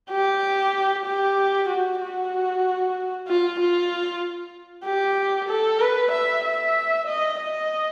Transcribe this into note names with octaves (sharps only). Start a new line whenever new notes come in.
G4
G4
F#4
F#4
F4
F4
G4
A4
B4
E5
E5
D#5
D#5